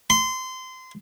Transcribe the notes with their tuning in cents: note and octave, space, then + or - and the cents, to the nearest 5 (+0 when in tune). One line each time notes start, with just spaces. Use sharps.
C6 -25